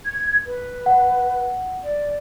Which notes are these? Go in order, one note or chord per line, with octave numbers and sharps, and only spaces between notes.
G#6
B4
F#5
D5